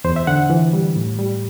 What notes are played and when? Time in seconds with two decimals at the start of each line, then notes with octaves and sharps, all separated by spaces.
0.04 E2 C5
0.16 E5
0.27 D3 F#5
0.50 E3
0.73 G3
0.96 A2
1.19 G3